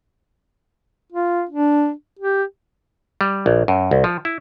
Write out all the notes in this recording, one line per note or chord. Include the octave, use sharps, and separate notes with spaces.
F4
D4
G4
G3
A#1
F#2
C2
F3
E4